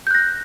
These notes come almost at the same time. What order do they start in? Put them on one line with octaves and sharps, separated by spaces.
G6 F#6 A#6